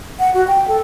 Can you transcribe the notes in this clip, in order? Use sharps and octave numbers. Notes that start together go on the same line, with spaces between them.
F#5
F#4
G5
A4